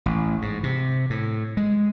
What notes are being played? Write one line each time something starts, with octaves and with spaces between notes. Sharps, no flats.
A1
G#2
C3
A2
G#3